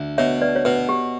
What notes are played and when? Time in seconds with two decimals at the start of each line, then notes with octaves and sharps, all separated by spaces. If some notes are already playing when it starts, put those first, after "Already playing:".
Already playing: D2
0.18 B2 C#5 E5
0.42 B4 D5
0.56 C#5
0.65 B2 B4
0.89 G4